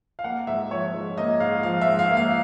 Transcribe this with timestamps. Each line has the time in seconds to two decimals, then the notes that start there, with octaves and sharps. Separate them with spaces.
0.19 F5
0.24 A#3 F#5
0.47 G#2 E5
0.71 F3 C#5
0.93 G#2
1.18 A#3 D#5
1.40 G#2 F5
1.63 F3 F5
1.81 E5
1.87 G#2
1.99 F5
2.11 A#3
2.17 F5